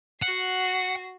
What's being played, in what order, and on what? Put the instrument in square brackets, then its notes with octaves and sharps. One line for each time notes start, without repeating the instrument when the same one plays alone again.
[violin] F#4 C7 [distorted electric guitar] F#5